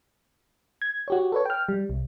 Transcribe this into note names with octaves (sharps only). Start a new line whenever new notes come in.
G#6
F#4 G4 C#5
A4 B4 C#5
G5 F6
G3
C2